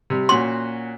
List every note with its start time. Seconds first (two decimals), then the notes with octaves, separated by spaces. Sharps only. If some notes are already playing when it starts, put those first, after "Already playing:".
0.10 C3 G3
0.29 A#2 C#4 F#4 C6